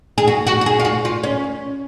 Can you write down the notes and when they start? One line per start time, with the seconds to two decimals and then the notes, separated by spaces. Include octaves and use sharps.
0.18 G#4
0.27 F#4
0.47 F#4
0.61 F#4
0.66 G#4
0.80 F4
0.85 F#4
1.05 F4
1.23 C#4